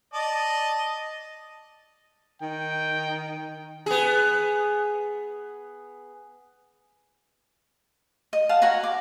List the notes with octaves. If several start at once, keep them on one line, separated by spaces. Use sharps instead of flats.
D5 D#5 A5
D#3 G5
B3 G#4
D#5
F5 F#5 A5
F#4 F#5 G#5 A#5
D6